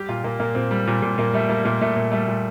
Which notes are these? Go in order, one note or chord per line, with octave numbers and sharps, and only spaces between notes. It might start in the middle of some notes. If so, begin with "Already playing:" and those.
Already playing: G3 G4
A#2 F4
A#2 A#3
A#2 A#3
A#2 C4
G3
A#2
A#2
A#2 A#3
G3 A3
G3 A#3
A#2 A#3
A#2 A3
A#2
G3 A3
A#2